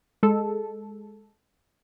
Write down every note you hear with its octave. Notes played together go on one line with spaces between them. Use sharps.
G#3 A4